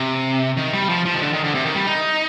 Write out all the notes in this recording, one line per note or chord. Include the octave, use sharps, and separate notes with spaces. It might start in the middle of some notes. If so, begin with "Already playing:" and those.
Already playing: C3
D#3
G3
F3
F3
D#3
D3
D#3
D3
C3
D#3
G3
D#4